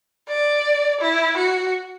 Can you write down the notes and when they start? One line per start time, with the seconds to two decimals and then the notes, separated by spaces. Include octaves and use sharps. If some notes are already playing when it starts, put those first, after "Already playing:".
0.29 D5
1.01 E4
1.37 F#4